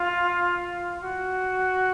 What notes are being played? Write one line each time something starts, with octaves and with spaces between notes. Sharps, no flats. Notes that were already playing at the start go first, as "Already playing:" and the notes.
Already playing: F4
F#4